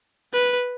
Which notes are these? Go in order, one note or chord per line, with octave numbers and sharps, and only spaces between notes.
B4